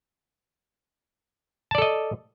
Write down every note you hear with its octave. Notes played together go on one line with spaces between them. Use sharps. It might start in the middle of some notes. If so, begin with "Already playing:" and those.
A4 D5 D#5 A5